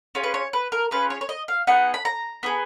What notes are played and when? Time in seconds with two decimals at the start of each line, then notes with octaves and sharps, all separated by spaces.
0.15 C#4 F4 G#4
0.23 B4
0.34 C#5
0.53 B4
0.72 A#4
0.91 C#4 F4 G#4 B4
1.10 C#5
1.21 C#5
1.29 D#5
1.48 F5
1.67 B3 D#4 G#4 F#5
1.94 B5
2.05 A#5
2.43 B3 D#4 G#4